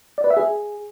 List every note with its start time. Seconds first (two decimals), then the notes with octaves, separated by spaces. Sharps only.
0.18 D5
0.24 B4
0.30 E5
0.37 G#4